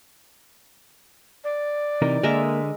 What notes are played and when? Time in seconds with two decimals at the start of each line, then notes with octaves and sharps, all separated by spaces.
1.44 D5
2.02 C3 E3 D#4 A#4
2.23 D3 G#3 A#3 A#4 E5